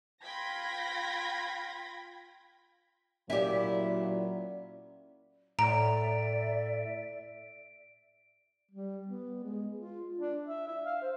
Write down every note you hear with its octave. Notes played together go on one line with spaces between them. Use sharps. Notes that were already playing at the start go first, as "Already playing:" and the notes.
F4 G5 B5 G#6 A#6 B6
A#2 F#3 C#4 E4 G4 D5
A2 D5 E5 A#5 D7
G3
B3
G#3
F4
D4
E5
E5
F5
C5